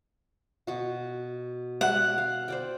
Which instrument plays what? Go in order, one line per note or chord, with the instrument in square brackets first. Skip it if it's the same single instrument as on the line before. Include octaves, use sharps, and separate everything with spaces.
[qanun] B2 F#4
[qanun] D5 E5 [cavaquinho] F#5
[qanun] F5
C5 D5 G5